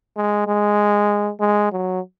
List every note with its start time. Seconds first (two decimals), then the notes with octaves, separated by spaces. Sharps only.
0.17 G#3
0.47 G#3
1.40 G#3
1.72 F#3